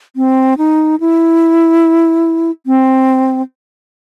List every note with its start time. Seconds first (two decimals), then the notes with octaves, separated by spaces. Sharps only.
0.16 C4
0.58 D#4
1.00 E4
2.66 C4